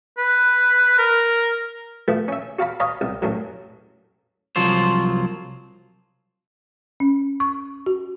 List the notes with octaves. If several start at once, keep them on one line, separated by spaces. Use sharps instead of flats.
B4
A#4
F3 A3 B3
C#4 E5
F#4 F5 A5 B5
C#5 D#5 F5 A5 B5
C2
F#2 A2 F#3
C2 F3 F#3 F4 C5
C#4
C#6
F#4